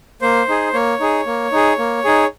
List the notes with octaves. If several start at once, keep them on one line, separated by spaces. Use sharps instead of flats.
A#3 C5
D#4 G#4
A#3 C#5
D#4 G#4
A#3
D#4 G#4
A#3
D#4 G#4